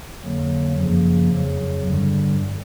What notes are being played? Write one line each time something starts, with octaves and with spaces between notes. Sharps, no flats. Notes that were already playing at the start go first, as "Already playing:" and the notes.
F2 D3 F#3 A#3
F#2 C#3 F3 A#3
F2 C#3 F#3
G2 D3 G3